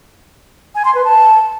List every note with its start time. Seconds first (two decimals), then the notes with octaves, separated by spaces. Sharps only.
0.75 G#5
0.85 C6
0.95 B4
1.05 A5